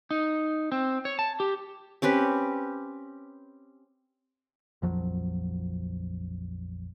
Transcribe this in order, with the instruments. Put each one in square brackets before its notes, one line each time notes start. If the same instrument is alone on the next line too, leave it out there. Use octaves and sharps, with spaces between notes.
[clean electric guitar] D#4
C4
C#5
A5
G4
[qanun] C4 C#4 G4 B4
[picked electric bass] A#1 F2 F3 F#3